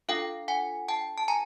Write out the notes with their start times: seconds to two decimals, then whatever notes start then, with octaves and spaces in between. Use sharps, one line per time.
0.09 D4 F4 A4 F5 G5
0.48 F#5 G#5
0.88 G5 A5
1.18 A5
1.28 G#5 A#5